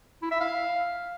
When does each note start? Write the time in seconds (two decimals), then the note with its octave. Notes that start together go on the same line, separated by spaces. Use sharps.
0.22 E4
0.31 E5
0.40 F5